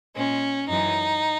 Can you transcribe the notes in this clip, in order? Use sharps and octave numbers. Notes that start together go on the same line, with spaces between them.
A#2 G#3 C#4
F#2 E3 G#3 D#4